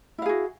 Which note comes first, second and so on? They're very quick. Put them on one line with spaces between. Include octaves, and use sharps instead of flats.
E4 F5 G#4 F#4